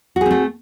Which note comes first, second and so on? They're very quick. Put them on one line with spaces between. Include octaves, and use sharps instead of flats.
F#4 G#4 C4 A3